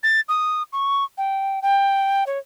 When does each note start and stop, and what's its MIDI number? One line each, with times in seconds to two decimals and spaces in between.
0.03 0.21 93
0.29 0.63 87
0.73 1.04 85
1.18 1.59 79
1.62 2.24 79
2.27 2.38 73